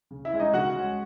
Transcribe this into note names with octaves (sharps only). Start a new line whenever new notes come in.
C#3
E4 E5
G#3 C#4
D#4 D#5
C#3 F#4 F#5
G#3 C#4